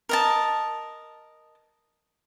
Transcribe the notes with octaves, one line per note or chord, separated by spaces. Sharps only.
A#4 D#5 A5